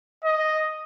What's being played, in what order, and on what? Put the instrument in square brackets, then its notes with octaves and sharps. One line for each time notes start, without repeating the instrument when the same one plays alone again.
[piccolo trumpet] D#5